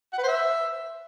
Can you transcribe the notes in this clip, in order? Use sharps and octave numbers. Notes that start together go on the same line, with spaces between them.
F#5
B4
C5
E5